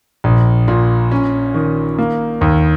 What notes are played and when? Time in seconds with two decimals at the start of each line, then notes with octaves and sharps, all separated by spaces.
0.24 A#1
0.68 A#2
1.11 C#4
1.54 D#3
1.99 A#3
2.41 D#2